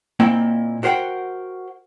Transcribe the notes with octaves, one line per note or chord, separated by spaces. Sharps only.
A#2 A#3 C4 E4 D#5 G5
F#4 A#4 C5 F#5 G5